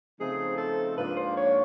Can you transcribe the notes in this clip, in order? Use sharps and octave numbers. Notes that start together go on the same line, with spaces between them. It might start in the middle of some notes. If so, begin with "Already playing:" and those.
C#3 F3 A3 C4 D#4 G#4
A4
G#2 F3 A#3 D4 F4 B4
C5
C#5